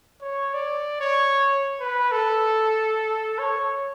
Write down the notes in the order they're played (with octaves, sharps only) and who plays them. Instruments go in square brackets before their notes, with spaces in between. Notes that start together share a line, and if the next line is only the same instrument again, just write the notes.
[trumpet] C#5
D5
C#5
B4
A4
C#5